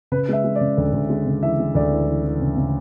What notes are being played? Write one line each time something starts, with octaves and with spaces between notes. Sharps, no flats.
C#3 B4
G#3 E5
G#3
D5
C#3
D2
D2
G#3
C#3
E3 E5
G#3
D2 D5
E3
E3
E3
C#3
C#3